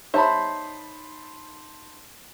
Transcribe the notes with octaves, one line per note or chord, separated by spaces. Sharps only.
D#4 C5 C#5 E5 A5 B5